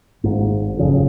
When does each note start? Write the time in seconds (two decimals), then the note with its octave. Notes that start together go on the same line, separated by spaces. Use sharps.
0.24 G#1 G#2
0.77 F#1 F2 C#3